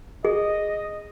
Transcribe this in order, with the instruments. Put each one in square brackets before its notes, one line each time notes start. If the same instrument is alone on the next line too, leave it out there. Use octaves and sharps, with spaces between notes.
[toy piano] G#4 [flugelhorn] D#5